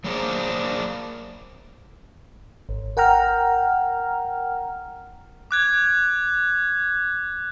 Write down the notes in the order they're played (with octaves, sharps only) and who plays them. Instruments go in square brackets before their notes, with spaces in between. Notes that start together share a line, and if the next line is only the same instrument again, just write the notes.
[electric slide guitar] F#3 A#3 D4 G#4 A#4 C5
[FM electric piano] G#1
A#4 F#5 G5 A#5 F6
[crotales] D6 F#6 G#6